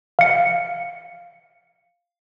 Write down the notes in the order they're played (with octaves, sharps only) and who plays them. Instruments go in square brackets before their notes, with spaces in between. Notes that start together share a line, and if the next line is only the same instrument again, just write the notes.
[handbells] F5 C#7